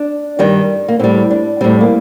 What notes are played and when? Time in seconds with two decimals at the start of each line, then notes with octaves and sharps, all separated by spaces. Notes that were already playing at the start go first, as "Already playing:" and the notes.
Already playing: D4
0.39 G2 D#3 G3
0.88 A#3
0.99 A2 G3 C4
1.31 D4
1.61 A2 G3 C4
1.81 A#3